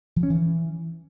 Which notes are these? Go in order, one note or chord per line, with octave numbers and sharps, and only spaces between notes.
F3
C#4
E3